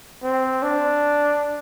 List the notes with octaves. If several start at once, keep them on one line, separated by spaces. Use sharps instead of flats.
C4
D4